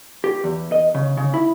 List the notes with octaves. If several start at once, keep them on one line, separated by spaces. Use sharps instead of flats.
G4
E2
D#5
C#3
C#3
E4